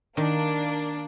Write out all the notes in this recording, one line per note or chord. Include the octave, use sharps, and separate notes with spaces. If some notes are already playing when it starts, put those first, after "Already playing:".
D#3 A#3 D4